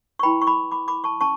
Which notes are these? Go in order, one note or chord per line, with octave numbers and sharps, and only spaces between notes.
C#6
E4 B4 G5 B5
C#6
B5 D6
B5 D6
B5 D6
A5 C#6
C#4 A5 C#6